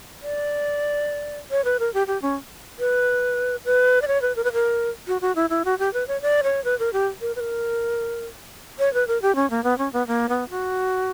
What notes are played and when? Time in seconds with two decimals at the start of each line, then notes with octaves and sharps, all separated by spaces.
0.22 D5
1.51 C#5
1.64 B4
1.79 A#4
1.94 G4
2.07 G4
2.22 C#4
2.79 B4
3.65 B4
4.02 D5
4.08 C#5
4.22 B4
4.36 A#4
4.44 B4
4.53 A#4
5.08 F#4
5.21 F#4
5.36 E4
5.50 E4
5.65 F#4
5.79 G4
5.94 B4
6.08 C#5
6.22 D5
6.43 C#5
6.64 B4
6.79 A#4
6.93 G4
7.21 A#4
7.36 B4
7.40 A#4
8.79 C#5
8.94 B4
9.07 A#4
9.22 G4
9.35 C#4
9.50 A#3
9.64 B3
9.78 C#4
9.93 B3
10.07 A#3
10.29 B3
10.50 F#4